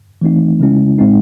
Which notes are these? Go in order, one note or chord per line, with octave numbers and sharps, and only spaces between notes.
E3 A3 C4 D#4
C#3 G#3 C#4 E4
A2 G#3 C4 D#4